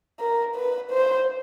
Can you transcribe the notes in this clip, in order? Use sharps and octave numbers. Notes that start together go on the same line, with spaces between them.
A#4
B4
C5